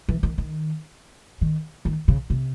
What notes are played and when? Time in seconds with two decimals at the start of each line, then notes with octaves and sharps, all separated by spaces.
0.08 E3
0.23 D#3
0.38 D#3
1.41 D#3
1.85 D#3
2.08 C#3
2.30 C3